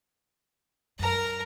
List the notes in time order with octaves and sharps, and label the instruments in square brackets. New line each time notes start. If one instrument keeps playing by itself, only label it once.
[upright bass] F#2 [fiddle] A#4 A#5